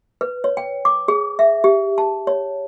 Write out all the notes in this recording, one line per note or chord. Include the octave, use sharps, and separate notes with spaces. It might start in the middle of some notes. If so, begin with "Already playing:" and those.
B4
C#5
G5
D6
G#4
E5
G4
A5
C#5